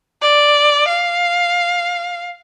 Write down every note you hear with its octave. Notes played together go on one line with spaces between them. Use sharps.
D5
F5